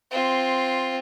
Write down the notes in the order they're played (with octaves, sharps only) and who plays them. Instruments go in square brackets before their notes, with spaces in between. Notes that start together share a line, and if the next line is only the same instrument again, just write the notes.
[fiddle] C4 F4